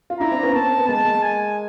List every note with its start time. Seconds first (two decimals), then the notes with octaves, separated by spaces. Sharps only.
0.10 F4
0.20 D4 E4 A#5
0.31 C4 D4
0.43 B3 C#4
0.54 A#3 C4 A5
0.78 B3
0.88 G#3 A#3 A5
1.05 G#3 A#3
1.23 G#5